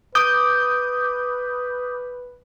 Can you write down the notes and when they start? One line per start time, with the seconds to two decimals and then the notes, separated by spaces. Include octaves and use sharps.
0.15 B4 D6 D#6 G6